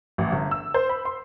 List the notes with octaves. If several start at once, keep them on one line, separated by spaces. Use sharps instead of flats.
A1
G1
E6
C5
B5
C6